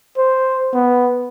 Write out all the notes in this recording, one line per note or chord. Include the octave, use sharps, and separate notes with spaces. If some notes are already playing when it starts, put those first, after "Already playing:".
C5
B3